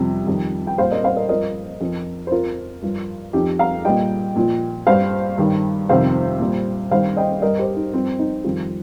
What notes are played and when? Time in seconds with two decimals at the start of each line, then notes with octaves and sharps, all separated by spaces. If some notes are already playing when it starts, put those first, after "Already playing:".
Already playing: F2 C3 G3
0.27 F2 D#3 G3
0.67 G5
0.78 A#2 G3 C5 F5
0.92 A#4 D#5
1.04 C5 F5
1.16 A#4 D#5
1.29 G2 F3 A#4 D#5
1.81 F2 F3
2.27 C5
2.32 F2 F3 F4 A#4
2.82 G2 F3
3.33 F2 F3 D#4 G4
3.59 F5 A#5
3.85 A#2 G3 D#5 G5
4.36 A#2 F3
4.87 G2 G3 C5 F5
5.38 G2 D#3 G3
5.89 F2 C3 D#3 G3 C5 F5
6.40 A#2 G3
6.91 G2 D#3 G3 C5 F5
7.17 D#5 G5
7.42 G2 G3 A#4 D#5
7.59 G4 C5
7.76 D#4
7.93 G2 F3 C4
8.19 D#4
8.44 F2 D#3 G3 C4 F4